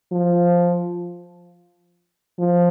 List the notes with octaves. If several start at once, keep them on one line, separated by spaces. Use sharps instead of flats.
F3
F3